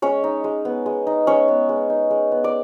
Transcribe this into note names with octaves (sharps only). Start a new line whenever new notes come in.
G#3 C#4 C#5
D#4
G#3
B3
G#3
D#4
G#3 C#4 C#5
B3
G#3
D#4
G#3
B3
D5